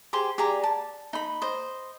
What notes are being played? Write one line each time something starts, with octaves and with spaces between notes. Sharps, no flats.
G4 G#4 C5 C6
G4 G#4 D5 A#5
A5
D#4 B5
C5 D#5